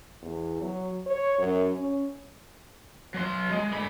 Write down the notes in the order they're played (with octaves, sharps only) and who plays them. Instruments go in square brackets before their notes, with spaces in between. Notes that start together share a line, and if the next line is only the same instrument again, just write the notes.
[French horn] E2
F#3
C#5
F#2
C#4
[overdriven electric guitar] F#3 C6
G#3
D3 B5